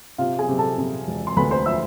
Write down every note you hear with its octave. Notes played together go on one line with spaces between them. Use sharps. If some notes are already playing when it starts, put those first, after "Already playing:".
C3 F4 F5
G#4 G#5
C3
A4 A5
C3
E1
C6
D2 B4 B5
C5 C6
F3 E5 E6